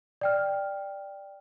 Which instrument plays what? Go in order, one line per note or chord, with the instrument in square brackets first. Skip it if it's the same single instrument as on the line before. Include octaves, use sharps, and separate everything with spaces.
[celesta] D5 G5 F6